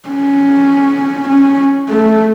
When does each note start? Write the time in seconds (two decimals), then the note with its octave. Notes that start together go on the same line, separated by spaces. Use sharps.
0.09 C#4
1.29 C#4
1.89 A3